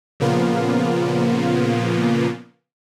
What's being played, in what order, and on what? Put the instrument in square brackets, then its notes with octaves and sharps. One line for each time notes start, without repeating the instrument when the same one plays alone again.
[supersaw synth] A#2 C#3 F3 A#3 B3 F4